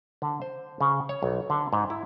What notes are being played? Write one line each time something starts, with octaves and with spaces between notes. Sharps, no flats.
D3
C5
C#3
C#5
B1
D3
G#2
E4